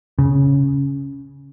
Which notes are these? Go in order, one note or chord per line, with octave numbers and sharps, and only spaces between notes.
C#3